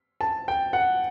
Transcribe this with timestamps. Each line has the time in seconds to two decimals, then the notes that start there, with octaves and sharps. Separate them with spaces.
0.21 A5
0.48 G5
0.73 F#5